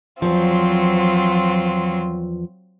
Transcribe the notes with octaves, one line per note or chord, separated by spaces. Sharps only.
E2 F3 F#3 C4 F4